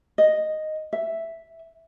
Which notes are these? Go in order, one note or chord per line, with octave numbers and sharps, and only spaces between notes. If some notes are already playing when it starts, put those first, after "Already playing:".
D#5
E5